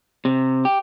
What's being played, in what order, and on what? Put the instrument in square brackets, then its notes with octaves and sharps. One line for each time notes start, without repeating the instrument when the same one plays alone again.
[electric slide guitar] C3
G4